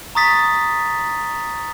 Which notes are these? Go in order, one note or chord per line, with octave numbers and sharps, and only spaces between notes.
A#5 C#6 D#6 A6 B6